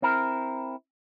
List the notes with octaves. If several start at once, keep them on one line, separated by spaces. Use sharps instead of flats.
C4 E4 A#4